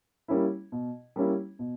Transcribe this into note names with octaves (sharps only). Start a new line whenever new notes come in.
G3 A#3 C#4 E4
B2
G3 A#3 C#4 E4
B2